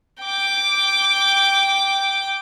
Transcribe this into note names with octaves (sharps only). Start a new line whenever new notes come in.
G5 D6